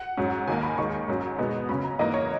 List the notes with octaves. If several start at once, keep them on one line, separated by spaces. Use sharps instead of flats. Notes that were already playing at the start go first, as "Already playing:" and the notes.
Already playing: F#5
G#2 F#3 C#4
D#2 D#3 A#3 G#5
B5
D#2 D#3 G#3 C#6
G#2 F#3 C#4
B2 G#3 B3 D#4
C#3 F#3 C#4 B5
A#5
G#2 E3 A#3 D#4 D#5
C#5